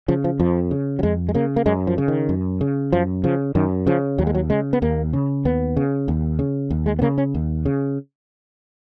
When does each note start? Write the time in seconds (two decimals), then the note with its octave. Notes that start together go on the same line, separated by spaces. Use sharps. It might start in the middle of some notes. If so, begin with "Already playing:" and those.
0.08 C#3 F3
0.24 F3
0.40 F2 F3
0.71 C#3
0.99 F#3
1.03 F2 G#3
1.29 G#3
1.34 C#3 A#3
1.56 A#3
1.66 F#2 G#3
1.87 F3
1.98 C#3
2.08 D#3
2.29 F#2
2.61 C#3
2.92 F#2 F3
3.24 C#3 F3
3.55 F#2 D#3
3.87 C#3 F3
4.18 D#2 F#3
4.27 G#3
4.35 F#3
4.50 C#3 G#3
4.73 B3
4.82 D#2 A#3
5.13 C#3
5.45 D#2 B3
5.77 C#3
6.08 D#2
6.39 C#3
6.70 D#2
6.86 G#3
6.99 B3
7.02 C#3 A#3
7.18 C#4
7.35 D#2
7.66 C#3